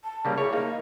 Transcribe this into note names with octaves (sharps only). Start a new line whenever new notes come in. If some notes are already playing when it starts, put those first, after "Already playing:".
A5
C#3 G3 A#3
E4 G#4 C#5
A#3 D#4 F5